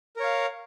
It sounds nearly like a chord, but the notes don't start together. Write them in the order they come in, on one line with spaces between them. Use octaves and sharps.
A#4 C#5 F5